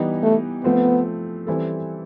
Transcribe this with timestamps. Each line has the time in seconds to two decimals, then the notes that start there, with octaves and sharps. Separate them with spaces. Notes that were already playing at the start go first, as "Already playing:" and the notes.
Already playing: E3 G3 B3 D#4 G4
0.23 A3
0.64 F3 A3 B3 C4
1.47 E3 G3 C4 E4 A4